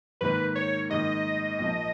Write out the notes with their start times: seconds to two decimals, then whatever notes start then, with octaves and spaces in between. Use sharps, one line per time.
0.21 G#2 D#3 A#3 D#4 B4
0.55 C#5
0.90 G#2 D#3 A#3 D#4 D#5
1.59 A#1 A#2 F3 A#3